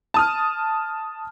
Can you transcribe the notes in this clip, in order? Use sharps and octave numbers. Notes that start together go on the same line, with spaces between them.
A5 D#6 F6